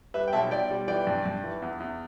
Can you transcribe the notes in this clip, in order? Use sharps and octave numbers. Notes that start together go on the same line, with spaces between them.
G3 B4 E5
G5
B1 E5 A5
B1 D5 G5
G3
E3 D5 G5
G2
G2
E3
E2
E2